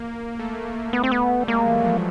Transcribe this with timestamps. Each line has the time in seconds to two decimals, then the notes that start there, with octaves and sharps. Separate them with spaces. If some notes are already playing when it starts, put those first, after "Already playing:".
Already playing: A#3
0.39 A3
0.93 B3
1.04 C4
1.12 B3
1.41 G3
1.48 G#3 A#3
1.66 E3
1.78 F#3
1.84 F3